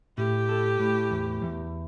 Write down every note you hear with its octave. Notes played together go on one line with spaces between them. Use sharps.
A2 G4
A4
A2
E2
E2